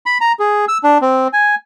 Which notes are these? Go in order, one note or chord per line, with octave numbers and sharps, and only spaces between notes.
B5
A#5
G#4
E6
D4
C4
G#5